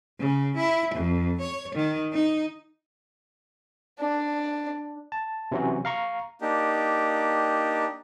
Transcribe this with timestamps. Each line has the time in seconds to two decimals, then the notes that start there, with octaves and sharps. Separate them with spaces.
0.19 C#3
0.57 E4
0.95 F2
1.41 C#5
1.75 D#3
2.13 D#4
4.00 D4
5.12 A5
5.52 C3 E3 F#3 C#4 F#4
5.85 F5 A#5 C#6
6.41 A#3 D4 D#4 G4